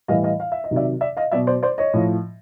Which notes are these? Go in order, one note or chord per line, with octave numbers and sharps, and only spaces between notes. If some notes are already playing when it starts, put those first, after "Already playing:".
A2 E3 G3 D#5 F5
D#5 F5
F5
E5
D#5
C3 D#3 F#3
D5 E5
D5 E5
D#5 F5
B2 F#3 D5 E5
C5 D5
C5 D5
C#5 D#5
A2 F3